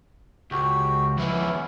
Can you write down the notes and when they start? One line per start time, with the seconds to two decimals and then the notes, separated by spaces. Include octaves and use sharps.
0.51 C#2 F#4 G4
1.17 F2 B3 C#4 E4